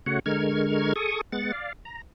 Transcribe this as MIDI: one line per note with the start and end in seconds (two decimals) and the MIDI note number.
0.06 0.19 49
0.06 0.19 57
0.06 0.19 66
0.06 0.19 73
0.06 0.19 78
0.26 0.93 50
0.26 0.93 56
0.26 0.93 70
0.26 0.93 85
0.26 0.93 89
0.26 0.93 92
0.96 1.21 68
0.96 1.21 69
0.96 1.21 85
0.96 1.21 87
1.32 1.52 56
1.32 1.52 59
1.32 1.52 78
1.32 1.52 93
1.52 1.73 74
1.52 1.73 77
1.85 2.02 82